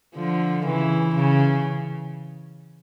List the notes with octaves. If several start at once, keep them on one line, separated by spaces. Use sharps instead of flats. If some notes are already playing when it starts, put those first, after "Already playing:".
D3 F3
C#3 E3
C#3